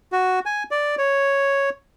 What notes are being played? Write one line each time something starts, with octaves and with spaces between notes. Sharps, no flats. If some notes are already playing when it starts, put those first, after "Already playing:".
F#4
G#5
D5
C#5